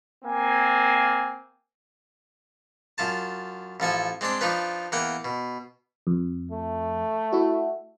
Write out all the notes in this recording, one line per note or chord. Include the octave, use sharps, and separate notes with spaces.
A#3 C4 G#5
F#2 F4 A5
A1 F3 A4 G#5
G#3 C4 D4 C6
F3 D4 D#4 F4 B4
E2 A#3 F#5 G5
B2
F2
A3
E4 F#4